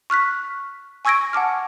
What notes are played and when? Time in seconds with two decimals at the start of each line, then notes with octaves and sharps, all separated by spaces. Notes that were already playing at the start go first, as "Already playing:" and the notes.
0.10 C#6 F6 F#6 B6
1.05 G#5 C#6 E6 G#6 A#6 D7
1.33 F#5 A5 D6 F6